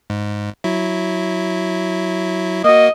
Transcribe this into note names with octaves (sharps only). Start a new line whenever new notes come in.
G#2
F#3 E4
A#3 F#4 D#5